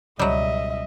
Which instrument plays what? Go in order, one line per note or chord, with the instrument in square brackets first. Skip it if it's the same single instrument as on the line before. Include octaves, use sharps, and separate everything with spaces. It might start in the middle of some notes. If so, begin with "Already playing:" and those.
[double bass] C#2 B2 [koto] F#3 G3 [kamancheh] D#5 E5